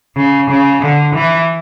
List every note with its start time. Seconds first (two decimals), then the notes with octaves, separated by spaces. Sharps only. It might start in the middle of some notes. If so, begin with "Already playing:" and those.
0.16 C#3
0.50 C#3
0.82 D3
1.14 E3